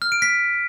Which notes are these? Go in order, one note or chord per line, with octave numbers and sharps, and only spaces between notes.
F6
D7
B6